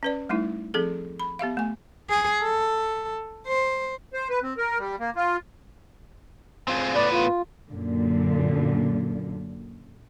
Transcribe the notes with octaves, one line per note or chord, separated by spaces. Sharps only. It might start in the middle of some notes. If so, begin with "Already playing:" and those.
C#4 B4 D5
G3 A3 D#4 E4
F3 C4 G#4 A4
B5
B3 G4 E5 F5
A3 G#5
G#4
A4
C5
C5
B4
C4
A#4
G3
A#3
F4
C4 F4 G#4
A2 B3 B4 D5
F4
F#2 A#2 D3